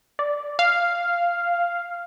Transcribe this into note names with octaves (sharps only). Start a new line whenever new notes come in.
D5
F5